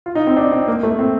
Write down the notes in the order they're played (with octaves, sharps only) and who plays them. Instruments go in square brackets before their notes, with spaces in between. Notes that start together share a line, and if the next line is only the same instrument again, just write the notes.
[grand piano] F4
D#4
C4
D4
C4
A#3
A3
C4